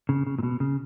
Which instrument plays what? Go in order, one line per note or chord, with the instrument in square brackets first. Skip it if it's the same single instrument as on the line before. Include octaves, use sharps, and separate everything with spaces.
[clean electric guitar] C#3
C#3
A#2
B2
C#3